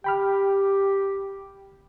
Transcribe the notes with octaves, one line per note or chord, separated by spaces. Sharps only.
G4 G5 B5 F6